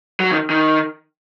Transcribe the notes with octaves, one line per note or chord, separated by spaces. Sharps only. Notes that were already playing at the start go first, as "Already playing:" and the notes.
F#3
D#3
D#3